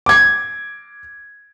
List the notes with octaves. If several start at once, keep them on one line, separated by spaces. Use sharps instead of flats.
D6 G#6